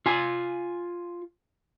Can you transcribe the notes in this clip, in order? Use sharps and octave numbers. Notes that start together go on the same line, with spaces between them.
F4 G#5